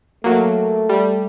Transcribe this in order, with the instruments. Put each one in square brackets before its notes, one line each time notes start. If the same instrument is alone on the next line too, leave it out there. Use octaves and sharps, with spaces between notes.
[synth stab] F#3 A#3 [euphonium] A3
[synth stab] G3